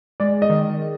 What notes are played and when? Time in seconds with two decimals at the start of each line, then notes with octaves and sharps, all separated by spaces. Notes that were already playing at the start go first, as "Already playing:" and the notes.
0.20 G#3 D5
0.42 D#5
0.50 D#3